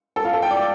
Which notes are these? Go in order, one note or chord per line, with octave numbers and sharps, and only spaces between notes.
A4
F4
A4
G5
D5